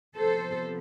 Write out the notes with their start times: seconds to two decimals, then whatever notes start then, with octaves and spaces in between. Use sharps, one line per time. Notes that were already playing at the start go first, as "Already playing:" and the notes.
0.16 C3 F3 B3 A4 C5